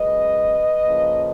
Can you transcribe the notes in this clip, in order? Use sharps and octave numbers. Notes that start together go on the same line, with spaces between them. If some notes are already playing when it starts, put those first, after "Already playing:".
Already playing: F#2 C#3 G#3 B4 D#5
C#3 F3 A#3